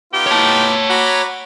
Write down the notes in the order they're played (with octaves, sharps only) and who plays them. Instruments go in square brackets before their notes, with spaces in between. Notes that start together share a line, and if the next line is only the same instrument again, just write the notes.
[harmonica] B3 D#4 F4 [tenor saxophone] G4
[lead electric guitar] C#5 A5
[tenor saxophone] F#4 [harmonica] A#5 B5 D6